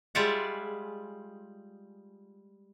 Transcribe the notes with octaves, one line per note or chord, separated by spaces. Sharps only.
G3 G#3 F4 D5 E5 F#5